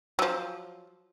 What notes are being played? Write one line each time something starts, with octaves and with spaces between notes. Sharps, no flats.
F3 F#3